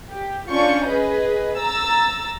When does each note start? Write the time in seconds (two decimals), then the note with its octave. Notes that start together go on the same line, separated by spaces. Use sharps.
0.11 G4
0.51 C#4 D4 F4 C#6 G6
0.88 G#4 B4 D#5
1.59 A#5 E6 A6